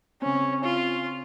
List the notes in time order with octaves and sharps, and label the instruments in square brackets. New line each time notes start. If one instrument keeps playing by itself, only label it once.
[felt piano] C#3 C4 [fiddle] C#4
[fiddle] F4